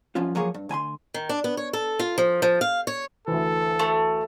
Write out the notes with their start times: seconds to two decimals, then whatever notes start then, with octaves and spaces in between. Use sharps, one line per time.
0.15 C2 F#2 F3 C#4 F4
0.35 F3 F#3 A#3 G#4 C#5
0.54 G2
0.69 D2 G#5 B5 C6
1.14 D#3
1.29 D4
1.44 B3
1.57 C#5
1.73 A4
1.99 F4
2.18 F3
2.42 F3
2.61 F5
2.87 C#5
3.27 D2 E3 A4
3.79 A3